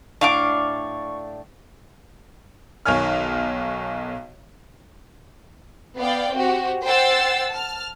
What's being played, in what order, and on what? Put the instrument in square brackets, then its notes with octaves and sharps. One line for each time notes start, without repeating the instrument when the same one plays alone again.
[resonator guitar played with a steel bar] A2 D4 [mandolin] F5 D6 [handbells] C#6
[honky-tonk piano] B1 D#3 C#5 G#5 F6
[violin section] B3 D5 F5 G5
C4 F#4 G4
C5 F#5 G5 E6 A6 C7
A5 F6